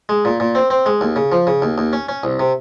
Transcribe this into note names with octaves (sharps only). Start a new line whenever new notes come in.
G#3
A#2
A#2
C4
C4
G#3
D#2
C#3
F3
C#3
D#2
D#2
C#4
C#4
C2
C3